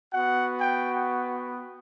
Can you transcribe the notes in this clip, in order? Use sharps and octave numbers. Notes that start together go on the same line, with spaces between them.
B3 F#4 F#5
G5